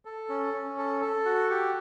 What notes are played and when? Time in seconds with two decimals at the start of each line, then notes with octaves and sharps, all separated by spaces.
0.05 A4
0.29 C#4
0.54 C#4
0.78 A4
1.01 A4
1.25 F#4
1.50 G4